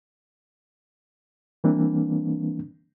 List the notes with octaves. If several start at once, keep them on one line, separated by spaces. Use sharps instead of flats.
E3 G3 A#3 C4 D4